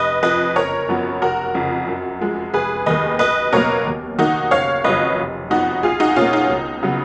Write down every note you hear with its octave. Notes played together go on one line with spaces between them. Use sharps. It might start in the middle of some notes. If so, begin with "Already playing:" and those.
Already playing: F1 B4 D#5
F2 F3 B4 D#5
F#1 A#4 C#5
F#2 F3 B3
F1 F#4 A#4
F2 C#3
F#2
F3 G#3
F1 G#4 B4
D#2 D#3 B4 D#5
B1 B4 D#5
B2 F#3 A#3 A#4 C#5
D#2
D#3 A#3 D#4 F#4
F#1 C#5 F5
F2 C#3 F#3 B4 D#5
F1
F2 F3 B3 D#4 F#4
B1 F4 G#4
D#4 F#4
B2 A#3 C#4 F4
D#4
C#2
C#3 F#3 B3